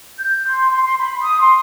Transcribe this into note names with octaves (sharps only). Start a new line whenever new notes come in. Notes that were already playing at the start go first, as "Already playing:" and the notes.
G6
C6
C6
C6
B5
D#6
C6